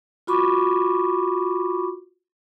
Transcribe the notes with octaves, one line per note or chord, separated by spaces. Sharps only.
F4 F#4 B5 C#6 D6